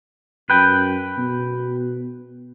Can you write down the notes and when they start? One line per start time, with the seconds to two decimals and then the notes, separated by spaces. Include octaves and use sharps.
0.50 F#2 B4 G5
1.18 B2